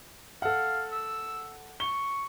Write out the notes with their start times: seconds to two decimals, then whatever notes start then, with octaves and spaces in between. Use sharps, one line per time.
0.42 A4 F5 F#5
0.92 E6
1.80 C#6 G7